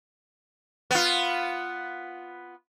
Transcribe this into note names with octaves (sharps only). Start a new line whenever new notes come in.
B3 F4